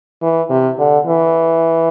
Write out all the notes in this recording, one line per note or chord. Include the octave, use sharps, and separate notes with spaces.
E3
C3
D3
E3